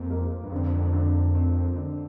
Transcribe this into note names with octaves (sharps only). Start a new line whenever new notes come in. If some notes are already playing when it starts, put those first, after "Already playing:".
Already playing: F2 A#3
A#3
G2
F2 D3
D3
C4
D3